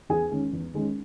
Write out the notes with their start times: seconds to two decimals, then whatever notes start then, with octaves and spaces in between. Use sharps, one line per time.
0.09 E2 G#4 G#5
0.31 D#3 G#3 C#4
0.53 E2
0.74 D#3 G#3 C#4